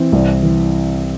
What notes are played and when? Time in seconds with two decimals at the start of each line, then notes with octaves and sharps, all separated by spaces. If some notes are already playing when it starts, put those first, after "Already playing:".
Already playing: E3 C4
0.12 C2
0.43 E3